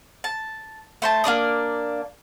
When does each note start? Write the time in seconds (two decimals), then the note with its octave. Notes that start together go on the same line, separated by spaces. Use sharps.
0.24 A5
1.02 A3 C5 A5
1.24 A#3 D4 D5 D#6